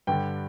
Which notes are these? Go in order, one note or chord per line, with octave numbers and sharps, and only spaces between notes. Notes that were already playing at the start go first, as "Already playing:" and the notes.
G2 D3 G3 G5